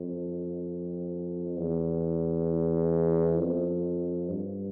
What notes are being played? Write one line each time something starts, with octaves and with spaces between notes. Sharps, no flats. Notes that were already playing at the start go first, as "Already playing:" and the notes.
Already playing: F2
E2
F2
G2